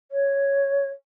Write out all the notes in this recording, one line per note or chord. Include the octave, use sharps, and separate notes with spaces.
C#5